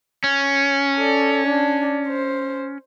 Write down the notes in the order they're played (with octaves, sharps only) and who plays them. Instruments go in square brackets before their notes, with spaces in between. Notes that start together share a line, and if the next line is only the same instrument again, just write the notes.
[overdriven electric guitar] C#4
[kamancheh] A4 D5
D4 D5
C5